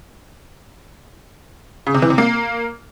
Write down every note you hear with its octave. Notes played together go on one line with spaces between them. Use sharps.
C#3
C3
E3
C3
A#3